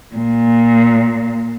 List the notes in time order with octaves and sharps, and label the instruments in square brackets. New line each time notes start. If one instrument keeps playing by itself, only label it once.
[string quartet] A#2